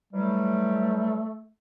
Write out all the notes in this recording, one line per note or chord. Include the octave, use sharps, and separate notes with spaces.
E3 F#3 G3 A3